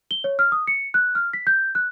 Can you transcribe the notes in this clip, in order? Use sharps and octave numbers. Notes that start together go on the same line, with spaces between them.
G7
C#5
F6
D#6
C#7
F#6
F6
B6
G6
F#6